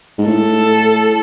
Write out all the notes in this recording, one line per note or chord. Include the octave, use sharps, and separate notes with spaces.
G#2
A2 A4